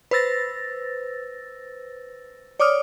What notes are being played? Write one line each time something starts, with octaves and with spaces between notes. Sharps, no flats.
B4 C5 E6 A6 A#6
C#5 D5 D6 D#6 F6